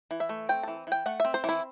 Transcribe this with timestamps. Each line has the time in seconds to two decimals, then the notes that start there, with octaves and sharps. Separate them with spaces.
0.11 E3
0.20 E5
0.29 A3
0.49 C4 G5
0.63 E3 A5
0.87 E3 G5
1.06 A3 F#5
1.20 C4 E5
1.34 C5
1.44 E3 E4